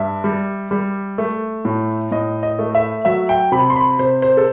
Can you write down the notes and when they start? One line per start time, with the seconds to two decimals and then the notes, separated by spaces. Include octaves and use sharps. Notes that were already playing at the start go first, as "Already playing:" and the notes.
Already playing: G2 E5
0.24 G3
0.71 G3
1.18 A3
1.65 A2
2.11 A2 D#5
2.43 D#5
2.59 A3
2.75 E5
3.05 F#3 E5
3.29 G5
3.52 C3 B5
3.70 C6
3.76 B5
3.99 C3 C5
4.22 C5
4.37 A4